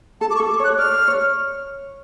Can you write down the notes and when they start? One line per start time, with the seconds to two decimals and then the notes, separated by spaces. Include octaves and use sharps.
0.21 A4 A5
0.30 D6
0.36 C#6
0.40 A4
0.50 D6
0.60 C#5 F#6
0.78 D5 F6
1.08 C#5